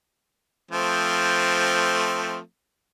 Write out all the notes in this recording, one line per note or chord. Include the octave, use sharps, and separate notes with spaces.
F3 A3 C4